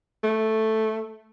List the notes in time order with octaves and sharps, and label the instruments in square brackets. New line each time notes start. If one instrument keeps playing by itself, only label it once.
[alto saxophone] A3